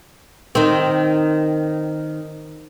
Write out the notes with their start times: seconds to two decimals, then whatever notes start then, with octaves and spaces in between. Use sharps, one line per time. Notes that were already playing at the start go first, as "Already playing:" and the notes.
0.55 D#3 C4